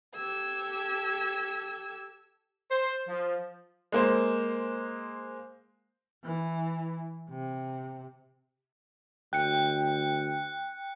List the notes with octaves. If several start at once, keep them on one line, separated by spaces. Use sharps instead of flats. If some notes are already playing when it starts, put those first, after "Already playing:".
G4 A4 E6 G#6
C5
F3
G#3 A#3 C5
E3
C3
D2 G5 F#6 C#7